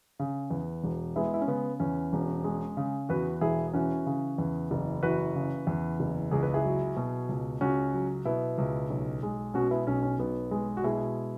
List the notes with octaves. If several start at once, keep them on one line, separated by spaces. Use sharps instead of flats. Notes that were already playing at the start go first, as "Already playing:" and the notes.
C#3
E2
E1
G#3 B3 E4
E4
C#4
C#3 B3
E2 C#4
E1
G#3
C#3
E2 F#4 B4
E1 E4 G#4
E3 C#4 F#4
C#3
E2
F#1
E3 F#4 B4
C#3
E2
F#1
C#2 G#4
B4
E4 G#4
F#3
B2
C#2
C#2 C#4 F#4
F#3
B2 B3 E4
C#2
B1
G#3
B2 C#4 F#4
B3 E4
B1 C#4
C#4
B1 B3
G#3
F#4
B2 E4 G#4